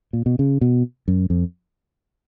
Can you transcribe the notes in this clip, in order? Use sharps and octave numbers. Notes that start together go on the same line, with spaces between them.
A#2
B2
C#3
B2
F#2
F2